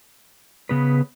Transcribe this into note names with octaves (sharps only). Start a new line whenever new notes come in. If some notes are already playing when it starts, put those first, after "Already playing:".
C#3 B3 G#4 B4